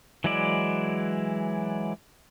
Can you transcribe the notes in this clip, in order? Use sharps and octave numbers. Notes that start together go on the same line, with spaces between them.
E3 F#3 G#3 E4 D5